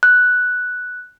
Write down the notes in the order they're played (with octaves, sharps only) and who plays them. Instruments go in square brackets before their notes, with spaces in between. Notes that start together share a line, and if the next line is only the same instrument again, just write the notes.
[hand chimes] F#6